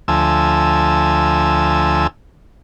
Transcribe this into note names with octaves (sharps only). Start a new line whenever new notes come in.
D2 F3 G#5 A5 E6